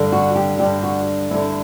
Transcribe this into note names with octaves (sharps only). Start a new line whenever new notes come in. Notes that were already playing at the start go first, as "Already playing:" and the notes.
Already playing: G2 D3
F#4
G4
G2 D3 G4
F#4
G2 D3 E4